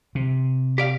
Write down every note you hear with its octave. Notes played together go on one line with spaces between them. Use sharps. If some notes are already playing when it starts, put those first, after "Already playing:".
C3
G4 D5 F5